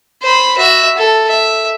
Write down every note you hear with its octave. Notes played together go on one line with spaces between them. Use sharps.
C5 B5
F#4 E5
A4
E5